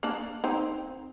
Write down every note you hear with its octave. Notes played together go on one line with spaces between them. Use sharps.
A#3 D4
C4 D#4